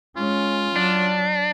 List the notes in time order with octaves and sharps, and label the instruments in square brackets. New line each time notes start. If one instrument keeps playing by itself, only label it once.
[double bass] G#3 C#4 [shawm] F4
[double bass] F#3 [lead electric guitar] D4